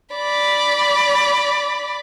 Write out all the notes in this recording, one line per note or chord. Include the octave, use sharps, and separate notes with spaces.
D5 B5